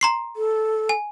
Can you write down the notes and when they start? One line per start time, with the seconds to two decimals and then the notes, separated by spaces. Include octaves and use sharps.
0.01 A#5 C6 C7
0.36 A4
0.89 G#5